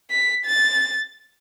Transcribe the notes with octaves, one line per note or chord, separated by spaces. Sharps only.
B6
A6